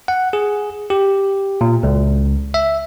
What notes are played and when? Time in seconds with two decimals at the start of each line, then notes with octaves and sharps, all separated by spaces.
0.08 F#5
0.33 G#4
0.90 G4
1.61 A#2
1.83 C#2
2.54 E5